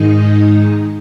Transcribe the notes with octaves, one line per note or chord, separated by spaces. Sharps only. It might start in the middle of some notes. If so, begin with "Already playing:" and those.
Already playing: G#2 D#3 G#3 D#4 D#5